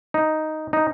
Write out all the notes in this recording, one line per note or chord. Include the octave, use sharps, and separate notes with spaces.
D#4
D#4